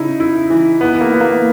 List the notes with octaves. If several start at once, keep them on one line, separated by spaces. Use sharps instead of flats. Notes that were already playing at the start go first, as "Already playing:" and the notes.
Already playing: C#3 D#4 E4
E4
E3
B3 E4
A#3
B3 E4
A#3